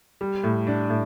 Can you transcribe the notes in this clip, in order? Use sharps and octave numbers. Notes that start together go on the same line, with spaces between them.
G3
A2
D4
A2